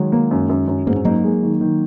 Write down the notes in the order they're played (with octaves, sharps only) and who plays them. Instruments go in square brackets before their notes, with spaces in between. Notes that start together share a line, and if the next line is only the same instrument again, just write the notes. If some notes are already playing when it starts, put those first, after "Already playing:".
Already playing: [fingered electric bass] D#3 G#3 [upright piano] F#3
[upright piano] A#3
F#2
F#2
F#2
[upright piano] G#2 [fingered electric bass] A#3
[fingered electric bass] C#4
[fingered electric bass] F#3 A#3 [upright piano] D#4
[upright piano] G#3
D#3
D#3